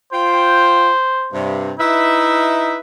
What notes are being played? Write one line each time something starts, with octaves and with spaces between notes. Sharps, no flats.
F4 C5 G5
G2 C3
D#4 E4 B4 E5